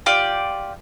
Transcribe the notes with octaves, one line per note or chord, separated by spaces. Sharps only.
F4 G4 D5